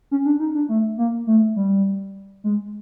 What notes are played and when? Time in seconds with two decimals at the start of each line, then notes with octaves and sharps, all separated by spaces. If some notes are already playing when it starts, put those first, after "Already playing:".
0.11 C#4
0.25 D4
0.40 D#4
0.55 D4
0.69 A3
0.98 A#3
1.27 A3
1.56 G3
2.44 G#3